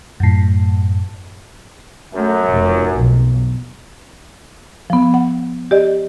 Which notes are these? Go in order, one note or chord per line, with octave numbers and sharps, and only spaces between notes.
F#2 A2
F#2 A3
F1
B1
F3 B3
F#5
G4 D5 D#5